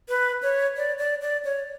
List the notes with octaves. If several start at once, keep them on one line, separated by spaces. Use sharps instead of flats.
B4
C#5
D5
D5
D5
C#5